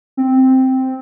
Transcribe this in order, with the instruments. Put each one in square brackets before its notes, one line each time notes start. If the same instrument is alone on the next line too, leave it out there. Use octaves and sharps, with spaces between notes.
[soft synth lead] C4